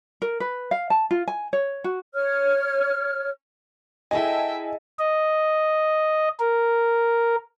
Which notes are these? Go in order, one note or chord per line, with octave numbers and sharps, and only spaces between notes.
A#4
B4
F5
A5
F4
G#5
C#5
F#4
C#5 F6
E4 G#4 A4 D#5 E5 G5 G#5
D#5
A#4